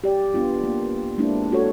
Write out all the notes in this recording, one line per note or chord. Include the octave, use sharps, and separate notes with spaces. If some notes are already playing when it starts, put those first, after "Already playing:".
G4 D5
B3 D4 F4
A#3
G#3 A#3 C4 D4 E4
F#4 A4 C#5